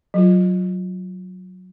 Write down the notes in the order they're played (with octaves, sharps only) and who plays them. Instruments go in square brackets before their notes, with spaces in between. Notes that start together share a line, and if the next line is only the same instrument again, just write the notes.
[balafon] F#3 F4